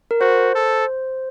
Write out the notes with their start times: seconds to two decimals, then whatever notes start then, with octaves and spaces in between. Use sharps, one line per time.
0.11 A#4
0.21 F#4 C5
0.55 A4